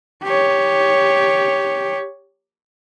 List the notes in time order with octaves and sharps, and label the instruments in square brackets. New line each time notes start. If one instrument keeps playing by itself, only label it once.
[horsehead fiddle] G4 C#5